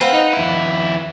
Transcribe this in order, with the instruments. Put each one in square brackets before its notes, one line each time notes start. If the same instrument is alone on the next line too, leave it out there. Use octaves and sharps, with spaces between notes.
[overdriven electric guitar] C4 [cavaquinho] B4 F5 F#5
[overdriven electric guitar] D#4
D#2 E4